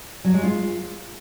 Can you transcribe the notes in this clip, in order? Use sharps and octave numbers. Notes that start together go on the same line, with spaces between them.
F#3
G#3
F4